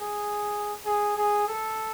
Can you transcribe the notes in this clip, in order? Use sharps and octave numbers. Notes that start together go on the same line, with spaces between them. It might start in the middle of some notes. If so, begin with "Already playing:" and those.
Already playing: G#4
G#4
G#4
A4